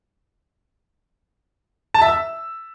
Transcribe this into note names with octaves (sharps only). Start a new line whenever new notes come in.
A5
E5
E6